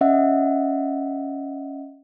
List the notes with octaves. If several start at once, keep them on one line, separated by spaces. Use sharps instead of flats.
C#4 D#5 E5 F#5